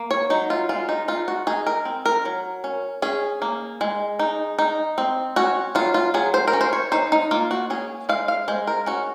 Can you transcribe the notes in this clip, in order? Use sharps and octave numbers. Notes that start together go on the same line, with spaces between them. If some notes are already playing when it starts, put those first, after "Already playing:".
Already playing: A#3
C#5
F#3 D#4
F4
G#3 F4
D#4
D#4 F4
F#4
D#4 G#4
A#4
C4
A#4
F#3
C#4
C#4 G#4
A#3
G#3
D#4
D#4
C4
C#4 F#4
F#3 F4
F4
F#3 G#4
C5
A#4
C#4
C5
C#5
D#4 C5
D#4
A#3 F4
F#4
C#4 G#4
G#3 F5
F5
G#3 C5
A#4
C#4 F#4